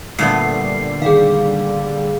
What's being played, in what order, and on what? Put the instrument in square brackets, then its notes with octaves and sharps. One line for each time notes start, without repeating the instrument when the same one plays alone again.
[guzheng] A#2 A3 B3 [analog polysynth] D3 G3 [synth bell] C7
[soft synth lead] D#3 [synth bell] G#4 F5